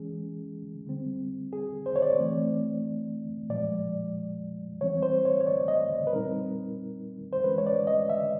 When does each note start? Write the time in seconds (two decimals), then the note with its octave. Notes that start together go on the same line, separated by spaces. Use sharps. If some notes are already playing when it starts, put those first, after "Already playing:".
Already playing: E3 G#3 C#4 G#4
0.87 D3 G3 C4
1.53 G#4
1.86 C5
1.96 C#5
2.02 D5
2.18 E3 A3 C4
3.50 A#2 F3 G#3 D5
4.81 E3 G3 C4 C#5
5.03 C5
5.25 C#5
5.40 C#5
5.47 D5
5.68 D#5
6.07 B4
6.12 A#2 G3 C4 D#4 A#4
7.33 C5
7.44 E3 G#3 C#4 B4
7.58 C#5
7.66 D5
7.87 D#5
8.09 E5